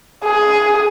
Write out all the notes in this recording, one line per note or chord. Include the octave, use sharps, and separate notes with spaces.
G#4